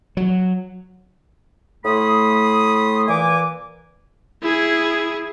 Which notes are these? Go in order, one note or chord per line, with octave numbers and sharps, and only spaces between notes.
F#3
A2 A3 B5 C6 D#6
A#2 E3 G#5 D6
E4 G#4